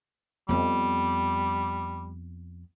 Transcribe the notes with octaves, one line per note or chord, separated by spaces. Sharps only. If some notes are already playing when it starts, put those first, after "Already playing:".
F2 G3 B3